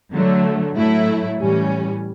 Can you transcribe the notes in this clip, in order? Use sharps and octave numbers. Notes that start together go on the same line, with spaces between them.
D3 F#3 A3
A2 F#3 A3 E4
A2 E3 G3 C#4